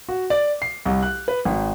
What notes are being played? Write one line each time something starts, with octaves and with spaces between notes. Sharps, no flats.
F#4
D5
C7
C2
F#6
B4
G#1